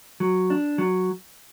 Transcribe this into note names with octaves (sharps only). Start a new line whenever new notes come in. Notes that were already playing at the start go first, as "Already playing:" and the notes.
F#3
D4
F#3